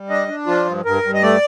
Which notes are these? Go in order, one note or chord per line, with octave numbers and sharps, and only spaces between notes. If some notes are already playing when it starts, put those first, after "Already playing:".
Already playing: G3
D4 D#5
D4
F3 F4
G2
G2 A#4
G2
D#5
A3 D5